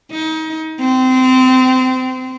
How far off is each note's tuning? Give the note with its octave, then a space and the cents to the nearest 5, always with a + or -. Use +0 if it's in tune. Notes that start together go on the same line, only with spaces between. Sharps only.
D#4 +30
C4 -25